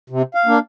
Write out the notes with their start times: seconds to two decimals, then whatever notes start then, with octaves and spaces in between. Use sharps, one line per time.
0.10 C3
0.35 F5
0.46 A#3 D4